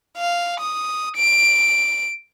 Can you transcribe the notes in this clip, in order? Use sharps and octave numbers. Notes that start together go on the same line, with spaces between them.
F5
D#6
D7